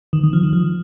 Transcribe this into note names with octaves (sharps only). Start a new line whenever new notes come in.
D#3
D#3
F3
D#3
F3